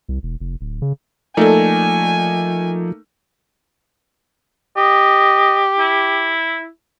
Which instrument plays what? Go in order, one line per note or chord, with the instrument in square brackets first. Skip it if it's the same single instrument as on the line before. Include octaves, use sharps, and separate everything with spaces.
[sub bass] C2
E1
F1
D1
C#3
[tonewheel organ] F3 [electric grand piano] A3 A#3 D#4 [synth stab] A4 D5 [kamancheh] G#5
[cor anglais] G4 [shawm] D#5
[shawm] E4